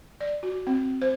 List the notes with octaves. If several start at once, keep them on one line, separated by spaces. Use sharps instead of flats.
D5
F#4
C4
C5